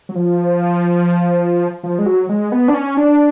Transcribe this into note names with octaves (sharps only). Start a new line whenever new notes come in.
F#3
F3
F3
G#3
F#3
G#3
B3
D4
C#4
D4